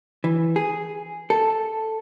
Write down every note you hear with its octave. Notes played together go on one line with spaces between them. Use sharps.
E3
G#4
A4